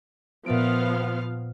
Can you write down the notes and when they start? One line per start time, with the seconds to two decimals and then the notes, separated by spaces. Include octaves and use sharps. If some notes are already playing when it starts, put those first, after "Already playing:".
0.46 A#2 F3 B3 E5 F5 D7